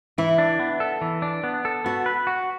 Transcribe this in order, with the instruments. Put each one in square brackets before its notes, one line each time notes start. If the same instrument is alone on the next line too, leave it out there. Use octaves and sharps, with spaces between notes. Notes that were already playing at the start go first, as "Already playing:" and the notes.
[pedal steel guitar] E3 [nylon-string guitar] E4
[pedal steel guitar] D4
B3
A4
E3
D4
B3
A4
[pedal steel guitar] B3 [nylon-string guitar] F#4
[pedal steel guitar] B4
F#4